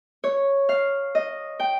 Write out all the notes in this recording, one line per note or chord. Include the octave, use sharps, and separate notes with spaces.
C#5
F5
D#5
G5